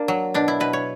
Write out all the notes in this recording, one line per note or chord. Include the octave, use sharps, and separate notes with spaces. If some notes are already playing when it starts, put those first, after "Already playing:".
Already playing: A#3 D4
F#3
B2 D4
E4
B2 B4
C#5